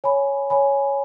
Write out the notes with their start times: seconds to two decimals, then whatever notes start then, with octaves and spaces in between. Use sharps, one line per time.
0.04 C#5 G#5 B5
0.50 C#5 G#5 B5